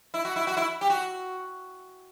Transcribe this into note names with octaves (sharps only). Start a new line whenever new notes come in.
E4
F#4
E4
F#4
E4
G4
F#4